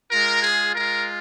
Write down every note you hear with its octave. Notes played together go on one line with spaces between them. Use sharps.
G#3 F4 A#4
G#4
G#3 F4 A#4